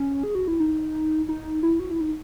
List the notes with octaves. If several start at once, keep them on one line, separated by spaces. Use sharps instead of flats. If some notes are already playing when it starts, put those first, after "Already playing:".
Already playing: C#4
G#4
F#4
E4
D#4
D#4
E4
F#4
E4
D#4